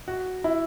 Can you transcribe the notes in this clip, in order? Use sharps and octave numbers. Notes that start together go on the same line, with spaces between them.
F#4
E4